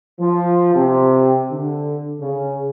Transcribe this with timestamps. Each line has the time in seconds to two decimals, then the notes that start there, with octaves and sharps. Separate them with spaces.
0.19 F3
0.74 C3
1.51 D3
2.20 C#3